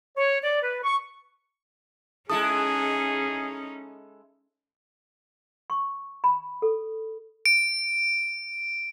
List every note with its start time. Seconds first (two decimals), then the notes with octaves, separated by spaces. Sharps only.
0.17 C#5
0.44 D5
0.63 B4
0.83 C#6
2.30 G#3 C#4 D#4 E4 G#4 A4 D#6
5.70 C#6
6.24 B5
6.62 A4
7.46 D7